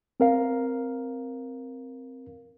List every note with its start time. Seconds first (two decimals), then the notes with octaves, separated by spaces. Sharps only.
0.20 C4 A#4 F5